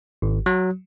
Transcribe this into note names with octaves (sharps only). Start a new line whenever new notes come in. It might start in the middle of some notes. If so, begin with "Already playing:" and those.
G#1
F#3